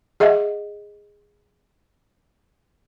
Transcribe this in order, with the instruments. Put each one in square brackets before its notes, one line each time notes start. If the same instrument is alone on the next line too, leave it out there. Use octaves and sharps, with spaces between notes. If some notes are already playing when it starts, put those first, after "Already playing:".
[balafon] G#4 D#5 E5 F#5